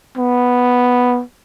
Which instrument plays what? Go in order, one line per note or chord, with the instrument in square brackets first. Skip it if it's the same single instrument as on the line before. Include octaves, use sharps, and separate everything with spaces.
[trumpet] B3